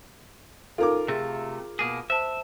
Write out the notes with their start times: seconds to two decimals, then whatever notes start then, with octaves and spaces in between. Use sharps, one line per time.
0.78 D#4 F4 A4 A#4 D6
1.08 C3 A3 G#4
1.79 B2 A#3 G#4
2.10 C5 E5 A5